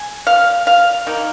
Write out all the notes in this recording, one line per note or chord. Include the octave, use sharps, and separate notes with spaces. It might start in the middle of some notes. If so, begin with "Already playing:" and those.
Already playing: G#5
F5
F5
D#3 A#3